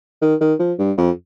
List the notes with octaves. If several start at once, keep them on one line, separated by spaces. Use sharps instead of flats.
D#3
D#3
F3
G2
F2